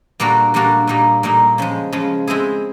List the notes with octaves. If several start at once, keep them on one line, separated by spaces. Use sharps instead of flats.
A#2 G3 A#3 D4 F#4
A#2 G3 A#3 D4 F#4
A#2 G3 A#3 D#4
A#2 G3 A#3 D#4
C#3 F3 G#3
C#3 F3 G#3
G#3 C4 E4 G#4